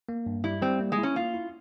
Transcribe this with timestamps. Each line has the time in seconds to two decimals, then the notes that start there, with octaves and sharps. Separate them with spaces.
0.09 A#3
0.26 G2
0.44 G3 E4
0.61 G3 C4
0.80 A#3
0.92 G#3
0.98 E4
1.03 C#4
1.15 A#3 F4
1.34 E4